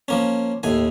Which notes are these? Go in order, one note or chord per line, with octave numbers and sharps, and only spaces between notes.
F3 A#3 C#4
D#2 A2 G#5